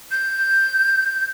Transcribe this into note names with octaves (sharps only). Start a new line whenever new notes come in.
G6